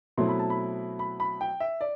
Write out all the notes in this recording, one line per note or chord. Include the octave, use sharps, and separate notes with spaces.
B2 F#3 A3 C4 E4 C6
B5
A5
B5
B5
B5
G5
E5
D5